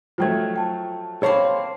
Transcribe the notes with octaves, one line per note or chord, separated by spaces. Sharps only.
F3 F#3 A3 F4 G5 G#6
G5 A5
A#3 C4 C5 C#5 F5 A5